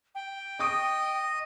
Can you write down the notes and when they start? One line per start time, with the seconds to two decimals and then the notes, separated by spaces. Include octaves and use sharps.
0.15 G5
0.60 D#5 C#6 D#6 D7